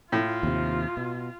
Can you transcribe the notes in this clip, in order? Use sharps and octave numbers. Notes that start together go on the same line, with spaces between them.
A2 F4
D#2 C3
B2